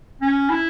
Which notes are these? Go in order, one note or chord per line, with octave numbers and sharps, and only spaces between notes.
C#4
E4